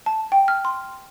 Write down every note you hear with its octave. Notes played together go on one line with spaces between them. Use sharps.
A5
G5
F6
C6